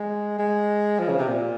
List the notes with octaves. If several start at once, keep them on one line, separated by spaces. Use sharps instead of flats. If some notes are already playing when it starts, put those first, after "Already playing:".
Already playing: G#3
G#3
F3
C#3
C3
A#2